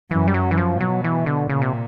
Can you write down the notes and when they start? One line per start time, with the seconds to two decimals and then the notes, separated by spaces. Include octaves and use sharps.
0.11 F#2 E3
0.28 G3
0.34 F#3
0.51 E3
0.57 F3
0.80 B2 F#3
1.04 E3
1.26 D3
1.49 A#2 C#3
1.62 C3